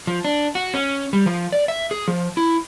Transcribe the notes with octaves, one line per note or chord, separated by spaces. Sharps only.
F3
D4
F#4
C#4
G3
F3
D5
E5
G#4
F3
E4